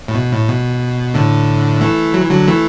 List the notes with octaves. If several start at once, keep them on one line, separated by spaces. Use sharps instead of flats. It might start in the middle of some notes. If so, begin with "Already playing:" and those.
A2
B2
A2
B2
A2 D3
E3 A3
F#3
E3
D3 F#3
E3 A3